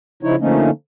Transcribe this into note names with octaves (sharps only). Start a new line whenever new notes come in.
C#3 F3 D#4 E4 C#5
D3 F3 A3 A#3 C#4 D#4